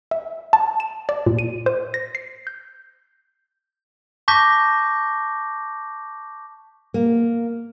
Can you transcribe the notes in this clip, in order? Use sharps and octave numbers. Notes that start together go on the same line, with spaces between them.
E5
A5
E7
D5
A#2
D#7
C5
A#6
C7
G6
A5 C#6 D6 G6 A#6 B6
A#3